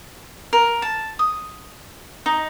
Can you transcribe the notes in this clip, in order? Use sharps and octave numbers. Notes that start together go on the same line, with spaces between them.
A#4
A5
D#6
D#4